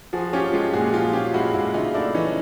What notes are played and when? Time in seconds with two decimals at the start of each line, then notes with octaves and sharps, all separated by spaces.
0.13 F3 F#4 G#4
0.33 C#4 F4 G4
0.53 G#3 F4 G4
0.73 A#2 F#4 G#4
0.94 F3 F4 G4
1.13 C#4 F4 G4
1.34 G#3 E4 F#4
1.54 A#2 E4 F#4
1.74 C#3 D#4 F4
1.94 A3 D4 E4
2.14 E3 C#4 D#4